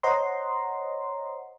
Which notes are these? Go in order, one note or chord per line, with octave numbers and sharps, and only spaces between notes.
C5 C#5 D#5 F#5 A#5 C6